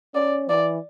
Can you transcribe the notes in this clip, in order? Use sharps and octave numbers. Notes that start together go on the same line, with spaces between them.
C#4 D5
E3 D5